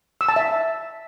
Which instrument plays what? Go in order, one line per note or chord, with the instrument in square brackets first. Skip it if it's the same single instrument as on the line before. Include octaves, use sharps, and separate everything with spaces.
[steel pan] E6
A5
E5